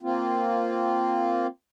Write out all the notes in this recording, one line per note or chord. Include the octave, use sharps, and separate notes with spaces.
A#3 C4 F4